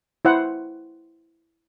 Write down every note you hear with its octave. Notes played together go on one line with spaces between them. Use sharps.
E4 C5 F#5